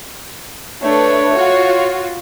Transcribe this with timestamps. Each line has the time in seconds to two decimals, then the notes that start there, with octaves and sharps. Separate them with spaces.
0.83 A3 D4 B4 C#5
1.36 F4 F#4